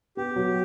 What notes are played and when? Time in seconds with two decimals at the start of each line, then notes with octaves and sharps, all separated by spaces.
0.17 B3 G4
0.36 F#3